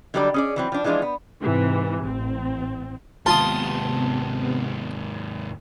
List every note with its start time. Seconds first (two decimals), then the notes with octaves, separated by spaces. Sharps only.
0.14 D3 F#3 G3 D4 C#5 D5
0.34 C#4 G#4 D5
0.56 E3 F#3 C4
0.72 F3 D4
0.84 E3 F3 G#3 D4 F4
1.02 B3
1.41 G#2 C3 E3
2.04 A1 C4
3.26 D#2 G#2 C3 B3 F4 A5 C6 D#6